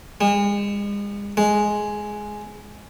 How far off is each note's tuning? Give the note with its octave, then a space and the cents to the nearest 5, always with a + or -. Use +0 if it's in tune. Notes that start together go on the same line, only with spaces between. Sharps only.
G#3 -40
G#3 +5